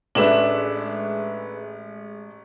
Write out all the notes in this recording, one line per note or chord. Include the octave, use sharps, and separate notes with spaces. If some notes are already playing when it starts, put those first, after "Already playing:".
A1 G#3 A3 D4 B4 E5 E7 F#7